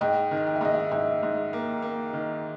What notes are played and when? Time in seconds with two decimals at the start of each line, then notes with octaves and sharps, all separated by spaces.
0.01 G#2 D#5 G5
0.31 D#3
0.47 G5
0.56 E5
0.61 G#2 D#5
0.74 E5
0.91 G#2 E5
1.23 G#2
1.53 A#3
1.82 A#3
2.13 D#3